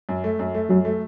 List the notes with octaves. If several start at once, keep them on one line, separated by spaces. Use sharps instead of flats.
F#2
A3
F#2
A3
F#2 F#3
A3